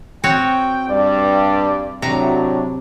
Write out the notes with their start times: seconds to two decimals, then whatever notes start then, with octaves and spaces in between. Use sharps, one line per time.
0.24 C4 F#4 C#5 G5
0.89 G2 D5
2.02 A2 C3 F#3 D4 A#5